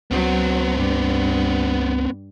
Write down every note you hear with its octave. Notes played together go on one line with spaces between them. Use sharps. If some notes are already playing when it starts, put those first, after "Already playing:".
C#2 F#3 B3 C4
G2